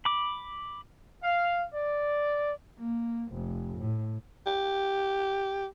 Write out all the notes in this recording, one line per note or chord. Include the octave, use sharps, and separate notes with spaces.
B5 D6
F5
D5
A#3
F1
A2
G4